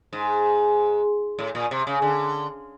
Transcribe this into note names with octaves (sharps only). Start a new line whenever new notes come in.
G#2
A2
A#2
C3
C#3
D3